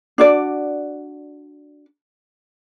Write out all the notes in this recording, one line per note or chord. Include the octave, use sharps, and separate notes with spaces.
D4 F#4 D5